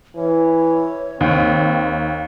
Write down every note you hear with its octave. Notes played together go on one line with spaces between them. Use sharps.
E3 C#5
D#2 C4